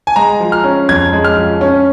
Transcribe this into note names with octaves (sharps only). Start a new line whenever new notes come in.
G#5
G#3 A#5
F3
F6
C#4
F2 G#6
G#3
F6
F3
C#4